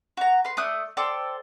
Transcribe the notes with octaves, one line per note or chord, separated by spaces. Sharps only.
F#4 A#5
B4 C6
A3 D5 D#6 F#6
A4 C5 D5 G5